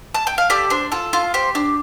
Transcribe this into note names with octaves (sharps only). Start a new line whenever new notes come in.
A5
G5
F5
G4 A4 D5
D4 C5
F4 A4
F4
G4 C5
D4